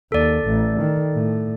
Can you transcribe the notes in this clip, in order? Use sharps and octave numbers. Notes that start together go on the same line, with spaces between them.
D#2 A4 D5
A1
D#3
A2